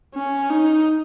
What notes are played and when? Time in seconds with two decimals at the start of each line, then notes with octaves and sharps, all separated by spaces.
0.15 C#4
0.50 D#4